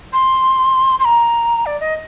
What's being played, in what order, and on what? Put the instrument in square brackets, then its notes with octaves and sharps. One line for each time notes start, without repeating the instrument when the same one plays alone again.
[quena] C6
C6
A#5
D5
D#5